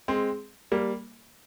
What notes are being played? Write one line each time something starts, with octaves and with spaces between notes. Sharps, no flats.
G#3 C4
G3 A#3